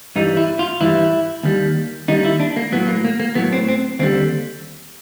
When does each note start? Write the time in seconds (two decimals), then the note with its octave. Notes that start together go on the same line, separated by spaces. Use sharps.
0.16 G2 E3 G3 D#4
0.37 E4
0.59 F4
0.81 G2 E3 G3 E4
1.43 D#2 D#3 G3
2.08 D#2 D#3 G3 D#4
2.25 E4
2.40 D4
2.57 A#3
2.72 A2 F#3 B3
2.88 A#3
3.05 A#3
3.20 A#3
3.35 A2 F#3 B3
3.52 C4
3.68 C4
3.99 D#2 D3 G3 C4